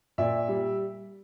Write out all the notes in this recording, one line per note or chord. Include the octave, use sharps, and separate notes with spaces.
A#2 D5 E5
G3